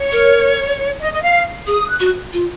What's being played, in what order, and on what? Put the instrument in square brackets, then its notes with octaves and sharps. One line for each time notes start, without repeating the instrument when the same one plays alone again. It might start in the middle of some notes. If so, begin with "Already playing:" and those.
Already playing: [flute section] C#5
[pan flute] A#4
[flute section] D#5
D#5
F5
[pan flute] G#4 [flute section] D#6
[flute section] F#6
[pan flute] F#4
F4